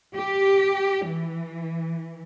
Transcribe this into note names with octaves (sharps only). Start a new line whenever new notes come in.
G4
E3